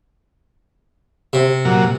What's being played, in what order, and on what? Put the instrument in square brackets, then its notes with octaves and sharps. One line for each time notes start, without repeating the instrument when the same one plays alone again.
[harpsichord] C3
[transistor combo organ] A#2 F#3